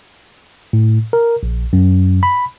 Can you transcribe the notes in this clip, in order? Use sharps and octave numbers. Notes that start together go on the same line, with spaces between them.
A2
A#4
A#1
F#2
B5